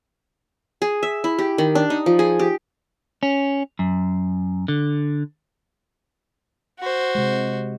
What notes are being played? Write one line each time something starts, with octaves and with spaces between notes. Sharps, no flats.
G#4
E5
E4
G4
D#3
D4
D#4
F3
G#4
G4
C#4
F#2
D3
F#4 C5
C3 G#3